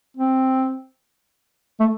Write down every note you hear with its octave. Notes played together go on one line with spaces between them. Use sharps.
C4
A3